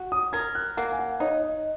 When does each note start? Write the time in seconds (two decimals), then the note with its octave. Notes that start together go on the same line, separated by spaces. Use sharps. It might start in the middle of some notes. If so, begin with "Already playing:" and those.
Already playing: F#4
0.12 D#6
0.33 A#4 G#6
0.55 F#6
0.77 A#3 F#5
0.92 G#5
0.99 F#5
1.20 D#4 C#5
1.42 D#5